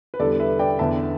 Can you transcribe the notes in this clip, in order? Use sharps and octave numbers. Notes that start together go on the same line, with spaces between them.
B4
E2 D3 G3 A4 D5
B4 E5
D5 G5
E2 D3 B3 D4 E5 A5